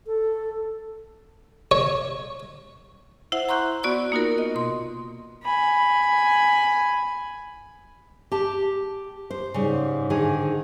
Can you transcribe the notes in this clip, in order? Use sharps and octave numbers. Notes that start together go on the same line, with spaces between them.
A4
C#5
E4 C5 E5 F#5
A#5 C6 C#6 F#6 G6
B3 F#4 D5 C#6 E6
A#3 D#4 F4 F#4 A#4
D#5
B2 C6
G#5 B5
G4 A5
C5
G#2 C#3 G3
D3 D#3 G#4